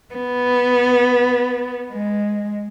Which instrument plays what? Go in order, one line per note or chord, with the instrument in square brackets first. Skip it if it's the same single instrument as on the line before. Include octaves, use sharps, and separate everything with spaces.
[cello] B3
G#3